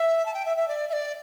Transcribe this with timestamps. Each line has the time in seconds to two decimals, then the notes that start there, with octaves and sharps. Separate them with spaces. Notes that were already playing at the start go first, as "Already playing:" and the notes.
Already playing: E5
0.26 A5
0.34 G5
0.45 E5
0.57 E5
0.68 D5
0.89 E5
0.93 D5